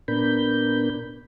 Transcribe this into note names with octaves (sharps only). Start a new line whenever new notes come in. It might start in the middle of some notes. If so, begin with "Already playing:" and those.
A#2 B3 D4 A#4 B5 G6